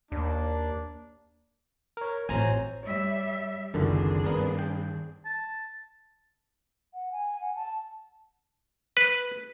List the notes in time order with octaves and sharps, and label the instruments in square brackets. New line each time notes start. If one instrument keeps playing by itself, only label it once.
[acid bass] D#2 [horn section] A#3 D4
[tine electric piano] A#4 C#5
[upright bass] A1 [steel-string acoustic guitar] F#2 F3 C4 [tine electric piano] G#5 A#5
[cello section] G3 E5 [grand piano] C#5
[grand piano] F#1 [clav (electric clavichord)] C#2 F#2 D3 [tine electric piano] D#3 [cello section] C4 D4 G#4
[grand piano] G2 [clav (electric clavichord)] B3 A#4
[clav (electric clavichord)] G5
[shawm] A5
[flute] F#5
G#5
F#5
A5
[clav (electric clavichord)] B4